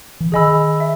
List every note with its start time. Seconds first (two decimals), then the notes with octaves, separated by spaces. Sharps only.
0.20 E3
0.32 D#3 G#4 D#5 G#5 B5 E6
0.80 E5